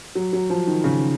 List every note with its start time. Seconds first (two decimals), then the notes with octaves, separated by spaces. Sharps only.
0.15 F#3
0.33 F#3
0.50 F3
0.67 D#3
0.84 C#3